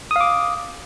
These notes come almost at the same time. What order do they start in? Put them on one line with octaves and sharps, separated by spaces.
D#6 F5 D6